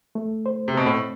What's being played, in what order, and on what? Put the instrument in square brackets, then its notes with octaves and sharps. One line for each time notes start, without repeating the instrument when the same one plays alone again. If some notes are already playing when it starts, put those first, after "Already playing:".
[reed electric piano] A3
C5
[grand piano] C3
[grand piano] B2 [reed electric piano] C4
[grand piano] A2